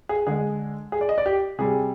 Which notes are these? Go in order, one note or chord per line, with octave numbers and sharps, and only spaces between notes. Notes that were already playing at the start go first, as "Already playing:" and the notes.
G#4
D3 G#3 G#4
G#4
D5
D#5
D5
G4
C3 G3 G#4